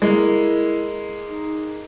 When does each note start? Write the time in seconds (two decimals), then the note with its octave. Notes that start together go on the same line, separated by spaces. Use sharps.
0.02 G#3 A#3 E4
1.28 D#4